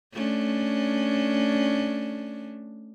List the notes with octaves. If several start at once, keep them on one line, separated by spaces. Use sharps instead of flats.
A3 C#4 D4